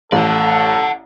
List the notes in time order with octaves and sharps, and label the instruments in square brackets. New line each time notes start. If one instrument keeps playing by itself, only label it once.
[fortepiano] A1 [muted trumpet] A4 [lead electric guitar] D5 F#5